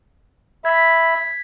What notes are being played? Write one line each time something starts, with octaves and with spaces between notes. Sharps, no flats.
E5 B5 G#6 B6